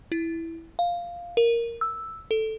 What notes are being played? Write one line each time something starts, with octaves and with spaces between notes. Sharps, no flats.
E4
F5
A#4
E6
A4